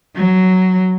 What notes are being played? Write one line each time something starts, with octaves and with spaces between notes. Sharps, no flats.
F#3